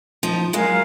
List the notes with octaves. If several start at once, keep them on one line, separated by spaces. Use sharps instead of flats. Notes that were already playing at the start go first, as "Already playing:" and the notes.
F3 D#4
F#3 G#3 A#4 F5 G#5